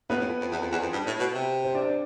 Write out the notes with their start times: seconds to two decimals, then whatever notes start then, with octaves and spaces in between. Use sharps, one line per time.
0.10 A2 B3 B4
0.20 F2
0.41 F2
0.51 E2
0.62 F2
0.71 E2
0.82 F2
0.93 G2
1.07 A2
1.19 B2
1.34 C3
1.64 C5
1.75 D4 D5